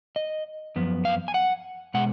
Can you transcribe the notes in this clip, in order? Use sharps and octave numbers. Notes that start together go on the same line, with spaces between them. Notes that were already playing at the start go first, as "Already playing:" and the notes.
D#5
F#2 F3 B3
F5
G#5
F#5
B2 G#3 F#5